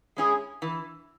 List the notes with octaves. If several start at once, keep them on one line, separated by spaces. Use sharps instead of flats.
G#3 C#4 E4 G#4
E3